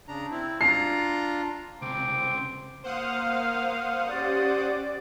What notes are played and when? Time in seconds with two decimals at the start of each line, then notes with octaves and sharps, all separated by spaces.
0.08 C#3 D4 A#5
0.31 C4 E4
0.61 D4 F4 A#5 C7
1.82 C#2 C3 C4 D6
2.83 A#3 C5 F5 F#5 D#6
4.09 C#4 G4 D5